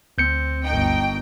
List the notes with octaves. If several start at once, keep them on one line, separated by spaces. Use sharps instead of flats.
D2 C4 G6 C#7
G1 D#4 G5